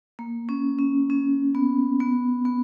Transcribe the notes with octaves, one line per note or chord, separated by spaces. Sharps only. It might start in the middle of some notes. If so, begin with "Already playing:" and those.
A#3
C#4
C#4
C#4
B3
B3
B3